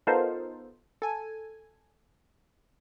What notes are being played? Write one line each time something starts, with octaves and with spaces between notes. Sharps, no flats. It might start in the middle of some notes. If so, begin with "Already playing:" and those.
B3 D#4 F4 A4 A#4 C5
A4 G#5